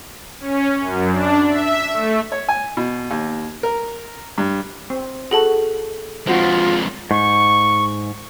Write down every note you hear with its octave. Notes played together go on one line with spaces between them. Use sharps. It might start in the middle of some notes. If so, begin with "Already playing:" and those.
C#4
F#2
D4
E5
A3
C#5
G#5
B2
D#2
A#4
G2
C4
F#4 G#4 A4 A5
F2 G#3 F4 F#4 C5
G#2 C#6